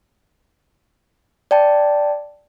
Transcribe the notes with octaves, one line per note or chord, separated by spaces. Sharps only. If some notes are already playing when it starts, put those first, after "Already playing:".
D5 G5 A5